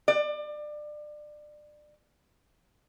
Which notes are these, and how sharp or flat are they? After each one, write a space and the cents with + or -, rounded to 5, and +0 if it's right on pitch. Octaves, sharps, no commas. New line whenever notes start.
D5 +25